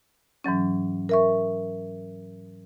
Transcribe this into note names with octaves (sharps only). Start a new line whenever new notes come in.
G#2 E3 F#3 C#4
A#4 E5 C#6